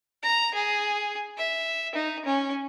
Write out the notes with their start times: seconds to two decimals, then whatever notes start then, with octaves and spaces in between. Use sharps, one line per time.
0.23 A#5
0.54 G#4
1.38 E5
1.95 D#4
2.25 C#4